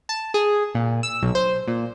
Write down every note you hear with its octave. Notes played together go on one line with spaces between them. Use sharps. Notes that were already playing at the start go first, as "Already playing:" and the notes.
A5
G#4
A#2
E6
B1
C5
A#2